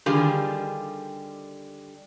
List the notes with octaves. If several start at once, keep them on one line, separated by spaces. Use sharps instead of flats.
D3 D#3 G3 F4 G4 G#4